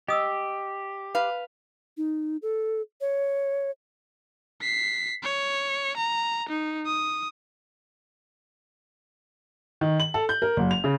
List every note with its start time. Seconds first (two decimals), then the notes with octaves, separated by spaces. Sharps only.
0.08 G4 D#5 D#6 E6
1.15 B4 F5
1.97 D#4
2.42 A4
3.01 C#5
4.61 B6 C7
5.23 C#5
5.97 A#5
6.49 D#4
6.86 D#6
9.81 D#3
10.00 F#7
10.14 A4
10.29 G6
10.42 A#4
10.57 F#1
10.71 F7
10.84 C#3